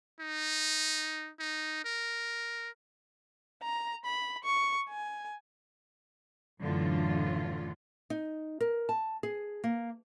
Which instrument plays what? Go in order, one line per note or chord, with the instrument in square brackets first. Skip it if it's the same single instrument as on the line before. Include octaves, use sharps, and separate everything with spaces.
[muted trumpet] D#4
D#4
A#4
[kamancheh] A#5
B5
C#6
G#5
[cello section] F#2 A2 D3 E3 F#3 F4
[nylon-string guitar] D#4
A#4
A5
G#4
A#3